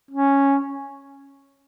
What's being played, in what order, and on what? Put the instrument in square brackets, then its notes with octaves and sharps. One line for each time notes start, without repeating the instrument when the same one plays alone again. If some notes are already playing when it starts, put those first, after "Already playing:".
[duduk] C#4